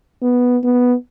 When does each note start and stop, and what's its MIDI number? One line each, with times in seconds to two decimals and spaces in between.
0.22 0.58 59
0.64 0.94 59